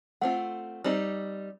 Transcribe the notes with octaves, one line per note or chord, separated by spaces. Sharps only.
A3 C4 F4 F#5
G3 C4 D#4